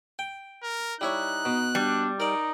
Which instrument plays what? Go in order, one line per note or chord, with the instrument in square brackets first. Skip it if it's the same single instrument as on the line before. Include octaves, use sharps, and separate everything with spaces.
[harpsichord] G5
[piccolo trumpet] A#4
[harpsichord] G3 E4 C#5 [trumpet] D#4 [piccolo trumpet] F#6
[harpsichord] B2
[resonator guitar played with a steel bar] G3 [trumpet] D4
[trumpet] D#4 [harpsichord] A#4 D5